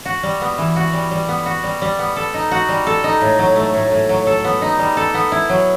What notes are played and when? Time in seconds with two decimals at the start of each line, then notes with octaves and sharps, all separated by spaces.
0.05 F#4
0.23 G3
0.41 B3
0.58 E3
0.76 F#4
0.93 G3
1.11 G3
1.28 B3
1.46 F#4
1.64 G3
1.82 G3
1.99 B3
2.16 A4
2.34 D#4
2.51 F#4
2.69 G3
2.87 A4
3.04 D#4
3.21 A2
3.39 F#3
3.56 A3
3.74 A2
3.92 A2
4.09 F#3
4.27 A4
4.44 B3
4.62 D#4
4.79 G3
4.97 A4
5.14 B3
5.32 E4
5.49 F#3